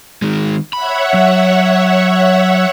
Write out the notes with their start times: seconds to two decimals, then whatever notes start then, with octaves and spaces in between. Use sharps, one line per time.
0.22 D#3 G#3
0.73 C#5 E5 F#5 B5
1.14 F#3